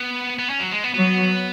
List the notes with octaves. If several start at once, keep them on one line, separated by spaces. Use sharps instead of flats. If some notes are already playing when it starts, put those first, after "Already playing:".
Already playing: B3
B3
C#4
F#3
G#3
B3
F#3 B3